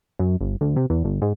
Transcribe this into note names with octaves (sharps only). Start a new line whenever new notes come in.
F#2
G1
D2
C3
E2
G1
G#2